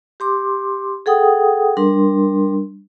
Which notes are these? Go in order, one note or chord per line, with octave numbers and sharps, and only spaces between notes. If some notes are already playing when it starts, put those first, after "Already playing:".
G4 C6 D6
G#4 A4 F#5 G5 D#6
G3 D4 A#4 C6